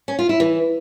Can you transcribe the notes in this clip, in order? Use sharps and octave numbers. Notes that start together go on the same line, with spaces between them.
C#4
F4
E4
E3